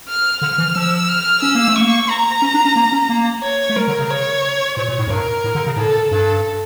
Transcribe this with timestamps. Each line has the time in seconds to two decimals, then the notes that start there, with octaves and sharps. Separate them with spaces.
0.08 F6
0.41 D3 F6
0.58 E3
0.75 F3 E6
1.08 F6
1.42 C#4 E6
1.55 A#3
1.68 A3
1.76 A#3 C#6
2.09 A#5
2.42 C#4
2.54 D4
2.65 C#4
2.76 A#3
2.92 C#4
3.09 A#3
3.43 C#5
3.70 A3
3.76 G3 A#4
3.87 D3
3.99 C#3
4.10 C#5
4.77 A#2 C#5
4.88 A#2
4.99 A2
5.07 F2
5.10 G2 A#4
5.44 A2
5.55 D3
5.67 C#3
5.76 A2 A4
6.10 G2 A4